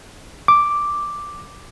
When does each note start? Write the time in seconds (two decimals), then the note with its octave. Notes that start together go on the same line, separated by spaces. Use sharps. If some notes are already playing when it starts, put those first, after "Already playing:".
0.48 D6